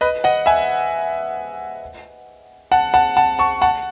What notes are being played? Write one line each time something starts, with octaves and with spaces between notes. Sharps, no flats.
B4 D#5
D#5 F#5
E5 G#5
F#5 A5
F#5 A5
F#5 A5
A5 C#6
F#5 A5